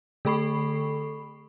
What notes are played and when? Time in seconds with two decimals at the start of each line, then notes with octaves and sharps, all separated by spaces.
0.25 D3 A3 A4 B5 C#6 C7